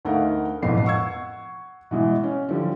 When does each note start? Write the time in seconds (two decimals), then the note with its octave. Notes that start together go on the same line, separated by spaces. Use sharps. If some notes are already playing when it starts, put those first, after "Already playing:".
0.05 D2 A3 D#4 A#4 F5 F#5
0.63 E1 A1 F2 B3 C7
0.84 F#5 C#6 E6 G#6
1.91 B2 E3 G#3
2.23 C#4
2.49 D3 F3 G3